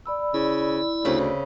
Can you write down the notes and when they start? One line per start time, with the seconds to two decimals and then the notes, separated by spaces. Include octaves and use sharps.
0.06 D5 B5 E6
0.34 C#3 E4
1.05 D2 C#3 C4 B4